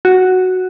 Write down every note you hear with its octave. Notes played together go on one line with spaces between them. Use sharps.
F#4